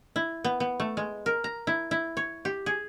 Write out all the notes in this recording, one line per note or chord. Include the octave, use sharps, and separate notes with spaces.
E4
B3
B3
A3
G#3
A#4
A#5
E4
E4
C#5
G4
G#4